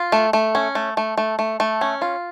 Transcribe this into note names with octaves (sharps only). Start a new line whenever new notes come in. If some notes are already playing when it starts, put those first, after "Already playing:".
Already playing: F4
A3
A3
C#4
A3
A3
A3
A3
A3
C#4
F4